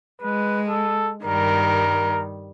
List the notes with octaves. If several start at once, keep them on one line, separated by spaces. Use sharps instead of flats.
G#3 B4
A4
G2 D#3 G3 A#4